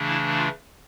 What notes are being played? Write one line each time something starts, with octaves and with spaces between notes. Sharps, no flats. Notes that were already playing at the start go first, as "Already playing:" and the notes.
Already playing: C#3 E3 A3 D4
E4
F4